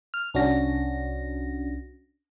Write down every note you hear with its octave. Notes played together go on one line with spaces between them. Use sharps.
F6
C2 C#4 D4 F#4 A#6